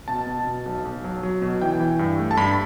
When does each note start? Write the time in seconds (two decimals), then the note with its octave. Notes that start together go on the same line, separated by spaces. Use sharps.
0.08 B2 A5
0.27 B2
0.47 B2
0.66 B1
0.85 B1
1.04 F#3
1.23 F#3
1.42 B2
1.61 E3 G5
1.80 E3
1.99 G2
2.19 A3
2.31 A5
2.37 G2 B5